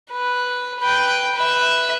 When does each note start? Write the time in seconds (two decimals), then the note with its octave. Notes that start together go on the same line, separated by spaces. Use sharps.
0.12 B4
0.80 B4 G5
1.35 B4 E5